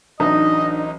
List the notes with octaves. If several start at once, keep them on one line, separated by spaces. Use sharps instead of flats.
A1 F#3 D4 D#4 D#5 E5